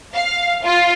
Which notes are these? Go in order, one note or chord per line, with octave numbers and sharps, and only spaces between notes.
F5
F4